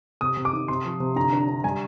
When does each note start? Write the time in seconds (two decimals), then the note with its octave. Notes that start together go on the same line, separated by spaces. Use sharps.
0.21 C3 D#6
0.37 C3
0.45 D6
0.53 D#3
0.68 C3 C6
0.85 F3
1.00 C3
1.16 D3 A#5
1.32 D4
1.48 D4
1.64 G3 G#5